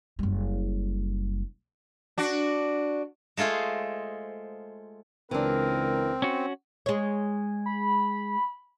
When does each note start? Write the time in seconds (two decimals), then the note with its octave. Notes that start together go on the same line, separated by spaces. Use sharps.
0.19 F#1 G3
2.18 D4 F#4
3.37 G#3 A3 F4 G#4 C5
5.31 C#2 E3 C4 D4 A#4
6.22 C#4 F#4
6.86 G#3 C#5
7.66 B5